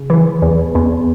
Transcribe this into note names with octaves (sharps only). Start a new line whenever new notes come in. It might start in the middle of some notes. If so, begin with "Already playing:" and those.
Already playing: C#3
E3
E2
E2